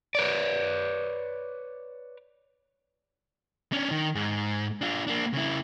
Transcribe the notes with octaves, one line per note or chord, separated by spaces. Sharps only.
B4 C#5 D5
C#4 D4
D#3
G#2
D4 F4
A#3 D4
C#3 E4